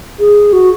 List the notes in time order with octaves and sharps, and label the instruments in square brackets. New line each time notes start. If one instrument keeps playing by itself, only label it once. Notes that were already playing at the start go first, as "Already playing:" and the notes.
[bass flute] G#4
F#4